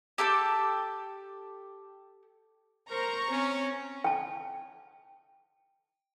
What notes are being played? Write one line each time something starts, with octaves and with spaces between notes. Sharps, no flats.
G4 A4 G5 D6
A#4 C5 A#5 C#6
C4 C#4
G5 A5